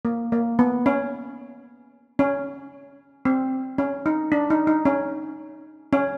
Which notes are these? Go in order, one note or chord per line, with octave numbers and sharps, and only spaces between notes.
A#3
A#3
B3
C#4
C#4
C4
C#4
D#4
D4
D#4
D#4
C#4
C#4